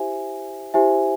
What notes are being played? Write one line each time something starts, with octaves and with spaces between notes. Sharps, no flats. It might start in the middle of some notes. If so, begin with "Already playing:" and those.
Already playing: E4 G4 C5 E5 G#5
E4 G4 C5 E5 G#5